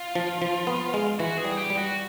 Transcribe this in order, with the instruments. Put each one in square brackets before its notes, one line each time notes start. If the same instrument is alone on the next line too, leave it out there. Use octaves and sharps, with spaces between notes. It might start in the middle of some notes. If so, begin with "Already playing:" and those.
Already playing: [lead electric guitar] F4
[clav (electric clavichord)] F3
F3
B3
G#3
[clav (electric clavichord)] E3 [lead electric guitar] F#4
[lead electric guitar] G#4
[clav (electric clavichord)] G3
[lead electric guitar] G#4
G4
[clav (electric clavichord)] G3
[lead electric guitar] F#4